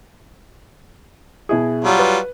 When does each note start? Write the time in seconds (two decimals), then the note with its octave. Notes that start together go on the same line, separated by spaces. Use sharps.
1.49 B2 E4 G#4
1.84 F#3 G3 F4
1.99 B4